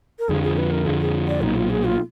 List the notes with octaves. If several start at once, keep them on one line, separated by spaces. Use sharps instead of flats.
A#4
F2 D3 F3 G#4
G#4
B4
A#4
F2 D3 F3 G#4
G#4
D5
B1 A#2 F#3 D#4
F4
G#4
F4